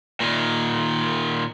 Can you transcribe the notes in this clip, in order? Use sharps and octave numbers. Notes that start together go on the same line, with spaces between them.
A#2 D#3